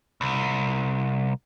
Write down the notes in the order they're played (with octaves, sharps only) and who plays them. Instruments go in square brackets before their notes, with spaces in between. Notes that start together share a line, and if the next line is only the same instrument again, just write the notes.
[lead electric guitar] C2